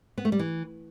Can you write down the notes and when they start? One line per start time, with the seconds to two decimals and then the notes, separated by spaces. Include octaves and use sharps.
0.18 B3
0.25 A3
0.32 G3
0.39 E3